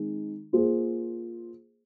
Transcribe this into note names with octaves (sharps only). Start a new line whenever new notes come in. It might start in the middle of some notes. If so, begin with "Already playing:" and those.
Already playing: D#3 G#3 C4
A#3 F4 G#4 C5